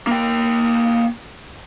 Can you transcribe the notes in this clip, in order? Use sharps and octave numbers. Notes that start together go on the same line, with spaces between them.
A#3 G5